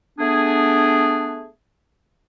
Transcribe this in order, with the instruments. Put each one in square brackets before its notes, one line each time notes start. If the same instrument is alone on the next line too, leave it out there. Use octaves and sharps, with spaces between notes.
[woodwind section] A3 B3 D4 G#4